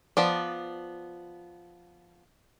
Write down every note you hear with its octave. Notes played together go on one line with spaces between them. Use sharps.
F3 B3 D5